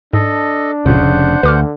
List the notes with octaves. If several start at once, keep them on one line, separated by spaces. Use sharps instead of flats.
G#2 D4 A4 D#5
F1 C#2 A#2 C#3 C5 F#5
D2 D3 B4 D6 F6